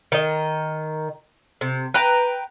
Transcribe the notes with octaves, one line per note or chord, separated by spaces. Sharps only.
D#3 D#5
C3
B4 G5 A#5